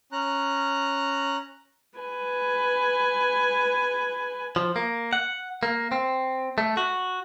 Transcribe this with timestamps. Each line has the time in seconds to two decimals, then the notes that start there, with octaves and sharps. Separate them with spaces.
0.12 C#4 A#5 F#6
1.99 B4 G#5
4.56 F3
4.76 A#3
5.13 F#5
5.63 A#3
5.92 C4
6.58 A3
6.77 F#4